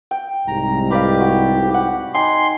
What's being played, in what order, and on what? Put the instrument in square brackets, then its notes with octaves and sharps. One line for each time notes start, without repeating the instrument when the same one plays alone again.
[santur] G5
[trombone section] C2 G#2 [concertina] A#5
[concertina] G4 [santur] B4 D5 F5
[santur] F#4
F#5
[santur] D#4 G5 G#5 [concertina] C6